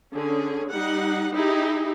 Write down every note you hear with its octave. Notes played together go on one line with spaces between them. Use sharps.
D3 C#4 G#4
G3 D#4 F#5
D#4 E4 G4 G#4